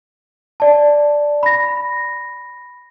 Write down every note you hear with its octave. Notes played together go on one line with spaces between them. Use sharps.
D5 A5
B5 A#6